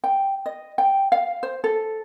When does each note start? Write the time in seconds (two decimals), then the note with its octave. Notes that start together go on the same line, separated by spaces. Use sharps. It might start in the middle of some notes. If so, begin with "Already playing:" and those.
0.04 G5
0.46 D#5
0.78 G5
1.12 F5
1.43 C5
1.64 A4